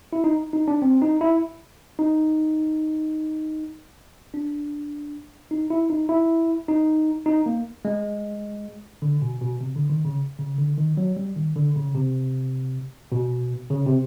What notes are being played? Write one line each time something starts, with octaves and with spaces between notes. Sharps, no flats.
E4
D#4
D#4
D4
C4
D#4
E4
D#4
D4
D#4
E4
D#4
E4
D#4
D#4
A#3
G#3
D3
B2
B2
C3
D3
D#3
C#3
C#3
D3
D#3
F#3
G3
D#3
D3
C#3
C3
B2
C#3
C3